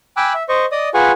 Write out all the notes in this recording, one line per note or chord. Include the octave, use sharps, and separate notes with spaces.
G5 G#5 B5 D6 E6 F#6
E5
C5 D#5 C#6
D5 D#5 D#6
F4 G#4 B4 F#5 G#5 C#6